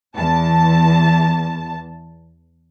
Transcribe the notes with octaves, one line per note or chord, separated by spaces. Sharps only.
E2 A5